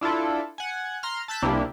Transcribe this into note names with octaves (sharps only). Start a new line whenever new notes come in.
D4 E4 F4 A4
F#5 G#5
A#5 C6 F6
A5 E6 F#6 G6 A6 B6
C2 C3 A#3 D4 E4 G4